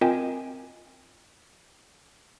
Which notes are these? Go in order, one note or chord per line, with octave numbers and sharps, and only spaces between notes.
C4 F4 A#4 D#5 G5 G#5